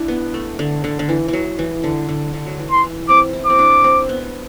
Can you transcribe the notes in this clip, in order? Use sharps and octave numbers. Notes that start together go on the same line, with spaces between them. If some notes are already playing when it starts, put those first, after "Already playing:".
Already playing: D4 E4
B3
A3
D3
D3
D3
E3
E3 F#3
E3
D3
D3
D3
F#3
E3
C6
E3
C4 D6
E4
C4 D6
D4
C4
B3